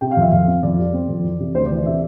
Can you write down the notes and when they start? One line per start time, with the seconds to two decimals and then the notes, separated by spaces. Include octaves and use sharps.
0.01 C3 G5
0.11 F5
0.17 F2 E5
0.31 F2 F5
0.47 C4
0.63 F2 D5
0.79 G3
0.93 C4
1.08 F2
1.24 E3
1.40 C3
1.55 D2 C5
1.66 D5
1.70 E3
1.76 D5
1.86 C3 E5